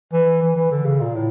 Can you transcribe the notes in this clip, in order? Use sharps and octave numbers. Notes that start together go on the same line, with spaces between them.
E3
E3
E3
D3
C#3
A#2
A2